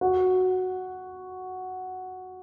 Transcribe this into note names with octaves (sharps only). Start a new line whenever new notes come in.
F#4